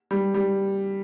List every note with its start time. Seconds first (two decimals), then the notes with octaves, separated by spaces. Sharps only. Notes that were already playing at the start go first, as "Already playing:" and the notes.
0.11 G3
0.34 G3